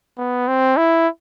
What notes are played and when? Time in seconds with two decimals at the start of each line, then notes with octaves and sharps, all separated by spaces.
0.18 B3
0.48 C4
0.77 E4